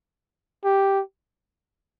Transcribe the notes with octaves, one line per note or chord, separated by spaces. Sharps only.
G4